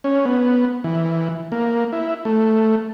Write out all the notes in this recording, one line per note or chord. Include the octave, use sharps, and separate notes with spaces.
C#4
B3
E3
A#3
E4
A3